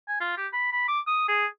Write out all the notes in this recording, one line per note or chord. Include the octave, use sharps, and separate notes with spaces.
G#5
F4
G4
B5
B5
D6
D#6
G#4